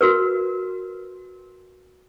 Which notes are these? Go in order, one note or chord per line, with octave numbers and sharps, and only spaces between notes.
F#4 A#4 B4